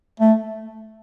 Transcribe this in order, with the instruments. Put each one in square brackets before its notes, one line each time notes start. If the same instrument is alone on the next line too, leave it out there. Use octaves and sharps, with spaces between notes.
[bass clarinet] A3